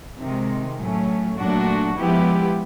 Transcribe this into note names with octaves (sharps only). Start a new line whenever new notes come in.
C3 D#3 G#3
A2 F#3 A3 C#4
A#2 F#3 A3 D4 F#4
F3 G#3 B3 E4 G4